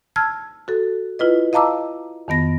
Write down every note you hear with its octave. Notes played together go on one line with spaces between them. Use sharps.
A5 E6 F6 G#6
F#4 A4
E4 F4 B4 D#5
D#5 F5 A5 A#5 D6 E6
F2 D#3 B3 A#6